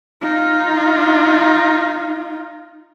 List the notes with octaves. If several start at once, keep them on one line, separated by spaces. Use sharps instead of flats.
D#4 F4